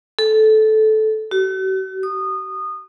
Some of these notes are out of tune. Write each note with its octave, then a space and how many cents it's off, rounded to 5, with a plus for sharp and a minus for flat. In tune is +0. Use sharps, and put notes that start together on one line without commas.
A4 -15
F#4 +45
D#6 -20